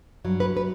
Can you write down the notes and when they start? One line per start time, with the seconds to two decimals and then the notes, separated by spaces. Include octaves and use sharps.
0.24 G2 F#3
0.40 B4
0.57 B4